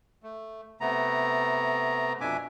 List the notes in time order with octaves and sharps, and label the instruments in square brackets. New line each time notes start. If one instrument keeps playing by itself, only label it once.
[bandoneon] A3
C3 A3 B3 A#5
F2 B2 D4 E5 G#5 D6